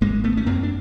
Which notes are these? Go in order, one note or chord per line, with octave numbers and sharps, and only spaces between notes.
G#1 G#3 A#3
A3 B3
C#4
F#2 A#3 C4
D4